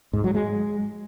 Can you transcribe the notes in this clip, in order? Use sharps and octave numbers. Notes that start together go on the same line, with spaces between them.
G#2
F#3
G#3